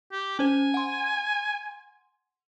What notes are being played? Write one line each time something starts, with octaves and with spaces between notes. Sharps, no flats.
G4
C#4 C5 G#5
F#5 C6